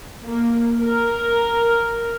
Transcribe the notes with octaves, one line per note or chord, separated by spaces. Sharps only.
A#3
A#4